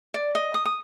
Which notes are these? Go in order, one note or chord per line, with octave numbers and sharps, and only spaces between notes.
D5
D#5
D#6
D#6